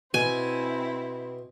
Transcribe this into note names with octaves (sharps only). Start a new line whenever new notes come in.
B2 C4 E4 G#5